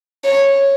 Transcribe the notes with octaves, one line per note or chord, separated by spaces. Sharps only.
C#5